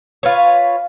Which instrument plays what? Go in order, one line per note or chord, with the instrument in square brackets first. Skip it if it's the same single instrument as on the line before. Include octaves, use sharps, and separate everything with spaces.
[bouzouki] F4 B4 C#5